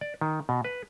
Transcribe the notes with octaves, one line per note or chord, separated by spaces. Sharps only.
D5
D#3
B2
B4